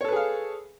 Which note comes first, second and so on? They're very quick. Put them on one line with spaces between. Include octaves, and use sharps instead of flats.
C#5 A4 B4 G#4 F5